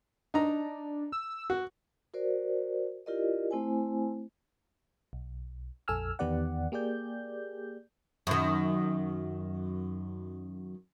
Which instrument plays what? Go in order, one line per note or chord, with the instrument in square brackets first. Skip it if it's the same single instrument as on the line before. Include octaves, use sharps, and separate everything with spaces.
[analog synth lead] D4 [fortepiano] D#4 A#5
[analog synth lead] E6
[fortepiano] F#4
[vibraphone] F#4 A#4 C5 D5
E4 F4 G4 A#4 D5 D#5
A3 C4 E4 C5 G#5
[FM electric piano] B1
A#1 F2 A4 G#5 E6 F6
E2 D#3 B3 G4 D5 F#5
A#3 G4 G#4 D5 G6
[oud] F#2 D#3